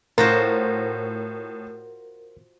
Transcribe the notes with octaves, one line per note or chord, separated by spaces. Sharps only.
A2 F4 F#4 A#4 C5